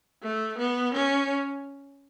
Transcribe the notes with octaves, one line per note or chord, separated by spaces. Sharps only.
A3
B3
C#4